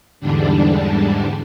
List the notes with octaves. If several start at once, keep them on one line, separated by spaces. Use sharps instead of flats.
E2 G#2 D3 G3 D4